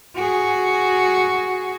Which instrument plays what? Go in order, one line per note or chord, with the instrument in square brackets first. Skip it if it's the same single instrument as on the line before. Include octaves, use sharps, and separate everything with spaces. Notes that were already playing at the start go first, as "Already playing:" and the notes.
[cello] F#4 G#4